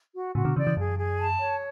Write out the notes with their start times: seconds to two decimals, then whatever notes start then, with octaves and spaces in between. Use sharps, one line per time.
0.14 F#4
0.35 A2 C#3 F#4
0.45 B2 D3
0.56 C#3 E3 D5
0.67 C#3 E3
0.77 F#2 G#4
0.98 G#4
1.19 A5
1.40 C#5